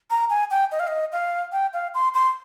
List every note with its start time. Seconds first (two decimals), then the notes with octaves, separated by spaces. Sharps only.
0.10 A#5
0.30 G#5
0.51 G5
0.72 D#5
0.80 F5
0.87 D#5
1.12 F5
1.52 G5
1.73 F5
1.94 C6
2.14 C6